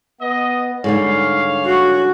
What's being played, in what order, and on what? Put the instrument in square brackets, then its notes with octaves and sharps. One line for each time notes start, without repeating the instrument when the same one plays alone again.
[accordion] B3 [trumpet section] D#5
[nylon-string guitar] G#2 D3 G3 [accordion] C#5 [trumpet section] F5
[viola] F#4